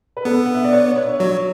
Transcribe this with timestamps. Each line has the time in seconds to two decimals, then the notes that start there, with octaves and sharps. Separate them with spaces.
0.17 B4
0.25 B3 A4
0.46 F#5
0.55 E5
0.65 D5
0.73 C#5
0.96 C#5
1.20 F#3 C#5